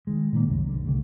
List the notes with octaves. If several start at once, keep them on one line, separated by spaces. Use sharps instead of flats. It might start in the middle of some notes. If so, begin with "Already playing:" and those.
D#3 G#3
A#2 D#3 A#3
C2 F#2
B1 D3
C2 D3 A3